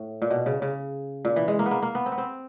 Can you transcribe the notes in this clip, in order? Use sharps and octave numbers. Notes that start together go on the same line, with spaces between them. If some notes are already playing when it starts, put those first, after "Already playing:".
Already playing: A2
A#2
B2
C#3
C#3
A#2
E3
G#3
A#3
B3
A#3
A#3
B3
C4
B3
C4